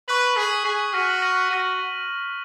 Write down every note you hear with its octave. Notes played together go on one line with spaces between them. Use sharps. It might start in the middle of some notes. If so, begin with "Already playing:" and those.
B4 C#6 F#6 B6 F#7
G#4 C#6 F#6 B6 F#7
G#4 C#6 F#6 B6 F#7
F#4 F6 A#6 D#7 F#7
F6 A#6 D#7 F#7
F#4 F6 A#6 D#7 F#7